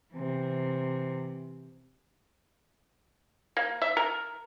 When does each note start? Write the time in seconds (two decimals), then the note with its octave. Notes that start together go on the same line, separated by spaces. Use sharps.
0.12 C3 E3
3.57 A#3
3.82 E5
3.97 A#4